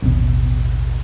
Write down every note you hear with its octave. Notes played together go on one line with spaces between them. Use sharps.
A1 D#2 B2